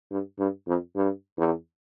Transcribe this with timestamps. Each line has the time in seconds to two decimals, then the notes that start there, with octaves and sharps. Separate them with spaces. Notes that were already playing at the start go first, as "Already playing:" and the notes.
0.11 G2
0.39 G2
0.67 F2
0.96 G2
1.38 E2